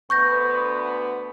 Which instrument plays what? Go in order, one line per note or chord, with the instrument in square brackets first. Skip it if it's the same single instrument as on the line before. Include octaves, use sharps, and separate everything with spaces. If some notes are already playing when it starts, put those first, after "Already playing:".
[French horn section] D2 B3 [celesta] C#6 G6 A#6